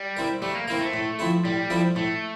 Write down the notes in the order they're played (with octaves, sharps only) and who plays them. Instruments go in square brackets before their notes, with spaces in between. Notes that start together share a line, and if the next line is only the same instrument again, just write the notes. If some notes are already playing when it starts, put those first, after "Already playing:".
Already playing: [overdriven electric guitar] G3
[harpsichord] C4 E4 A#4
[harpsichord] G3 [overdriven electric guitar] A3
[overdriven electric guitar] A#3
[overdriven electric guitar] A#3 [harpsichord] C4 E4 A#4
[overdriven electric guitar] A3
[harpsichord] A2
F3 C4 E4 A4
[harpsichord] A2 [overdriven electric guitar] G3
[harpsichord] F3 C4 E4 A4
[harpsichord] A2 [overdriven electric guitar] A3